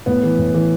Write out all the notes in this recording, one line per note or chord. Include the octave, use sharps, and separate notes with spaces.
A2 B3
E3
A2
E3